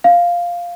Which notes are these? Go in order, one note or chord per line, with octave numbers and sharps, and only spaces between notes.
F5